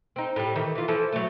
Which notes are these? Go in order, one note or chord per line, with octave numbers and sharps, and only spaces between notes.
C4 D#4
A2 G3
D#3 E3
E3 F4
E3 F3 A4
F#3 A3